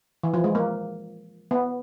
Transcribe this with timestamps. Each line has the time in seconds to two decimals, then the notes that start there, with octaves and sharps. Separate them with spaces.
0.23 E3
0.34 F3
0.44 G#3
0.55 A#3
1.51 B3